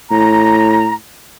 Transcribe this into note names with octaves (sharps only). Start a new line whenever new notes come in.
A2 A#5